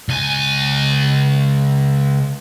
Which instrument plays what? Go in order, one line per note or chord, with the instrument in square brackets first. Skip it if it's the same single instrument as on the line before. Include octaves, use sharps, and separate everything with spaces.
[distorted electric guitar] C#2 G#5